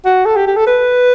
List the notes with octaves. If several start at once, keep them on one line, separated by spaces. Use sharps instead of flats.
F#4
A4
G4
G4
A4
B4